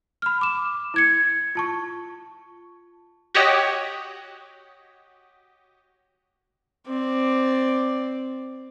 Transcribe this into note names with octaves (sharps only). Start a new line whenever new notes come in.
B5 F6
D6 E7
E4 G#6 C#7
F4 A5 C#6
F#4 G4 C#5 D#5
C4 D5